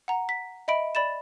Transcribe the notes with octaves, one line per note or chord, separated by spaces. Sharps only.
F#5 A#5
B6
D#5 E5 B5 D7
D5 B5 A6 E7